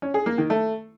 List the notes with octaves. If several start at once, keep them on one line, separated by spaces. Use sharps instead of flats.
C#4
G#4
A#3
D#3
A3